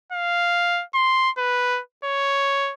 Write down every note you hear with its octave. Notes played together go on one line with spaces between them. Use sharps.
F5
C6
B4
C#5